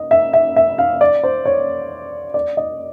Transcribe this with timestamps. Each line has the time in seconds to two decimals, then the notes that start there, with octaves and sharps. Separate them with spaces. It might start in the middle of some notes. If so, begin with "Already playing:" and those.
Already playing: D#5
0.11 E5
0.33 E5
0.56 E5
0.78 F5
1.01 D5
1.23 C5
1.45 C#5
2.34 D5
2.57 D#5